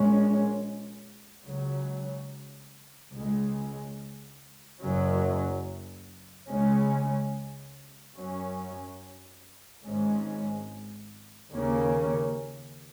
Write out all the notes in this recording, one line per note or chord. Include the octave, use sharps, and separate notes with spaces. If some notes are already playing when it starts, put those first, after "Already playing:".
Already playing: A#1 A#2 G#3 C#4
C#2 C#3 F#3
C#2 C#3 G#3
F#1 F#2 F#3 C#4
C#2 C#3 G#3 C#4
F#2 F#3 C#4
G#1 G#2 G#3 C#4
D#2 C#3 A#3 C#4